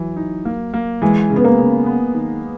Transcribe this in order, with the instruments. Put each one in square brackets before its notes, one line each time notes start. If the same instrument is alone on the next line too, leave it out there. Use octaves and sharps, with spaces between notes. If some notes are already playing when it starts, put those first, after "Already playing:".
Already playing: [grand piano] E3 [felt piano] F#3
[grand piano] D#4
A#3
A#3
[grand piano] E3 [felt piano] G#3
[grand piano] C#3
[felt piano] B3
A#3
[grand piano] C#3
B3
D#3